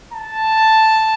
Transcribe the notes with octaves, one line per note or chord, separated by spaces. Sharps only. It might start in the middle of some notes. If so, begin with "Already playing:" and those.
A5